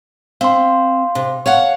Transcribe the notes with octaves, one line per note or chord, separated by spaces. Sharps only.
C4 F5 C6
C3
C#5 F5 F#5